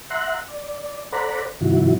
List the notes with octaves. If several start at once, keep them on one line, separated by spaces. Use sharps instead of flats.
E5 F#5 A#5 C6 F#6
D5
A4 C5 D5 F#5 A#5 B5
G2 C3 D#3 F3 E4 F#4